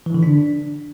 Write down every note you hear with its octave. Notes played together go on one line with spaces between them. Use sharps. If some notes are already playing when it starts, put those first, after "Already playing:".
E3
D3
D4